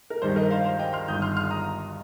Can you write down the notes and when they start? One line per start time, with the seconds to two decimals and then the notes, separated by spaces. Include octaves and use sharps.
0.10 A#4
0.22 G2 D#3 G3 C5
0.36 A#4 D#5
0.50 C5 F5
0.65 C5 F5
0.79 D#5 G5
0.93 C6 F6
1.08 G1 G2 D#3 D#6 G6
1.22 C6 F6
1.37 C6 F6
1.50 A#5 D#6